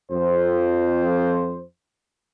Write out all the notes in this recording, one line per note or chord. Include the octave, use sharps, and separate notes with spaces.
F2 C5